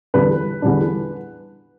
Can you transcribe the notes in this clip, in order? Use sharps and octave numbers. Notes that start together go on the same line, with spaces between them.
E2 D3 G3 D4 B4
E2 D3 G3 D4